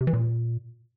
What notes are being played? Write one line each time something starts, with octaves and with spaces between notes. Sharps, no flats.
C3
E3
A#2